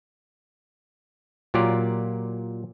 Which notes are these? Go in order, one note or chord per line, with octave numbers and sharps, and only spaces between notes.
A#2 F#3 F4 G4 A#4 D5